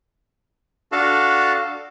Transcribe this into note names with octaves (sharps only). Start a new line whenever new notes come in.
D4 F#4 A4 F5 A5